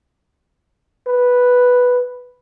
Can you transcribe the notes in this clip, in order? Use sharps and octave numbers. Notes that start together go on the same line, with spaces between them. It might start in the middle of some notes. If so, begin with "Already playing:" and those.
B4